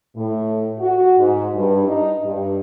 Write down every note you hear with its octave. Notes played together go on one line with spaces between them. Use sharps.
A2
F#4
G#2
G2
D#4
G2